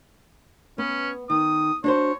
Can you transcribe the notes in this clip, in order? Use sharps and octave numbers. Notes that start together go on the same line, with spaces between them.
B3 C#4
D#3 D#6
D4 F#4 C5 C#5